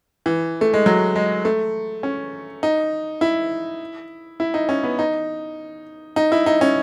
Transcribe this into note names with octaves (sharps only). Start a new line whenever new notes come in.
E3
A3
G#3
F#3
G#3
A3
C#4
D#4
E4
E4
D#4
C#4
B3
D#4
D#4
E4
D#4
C#4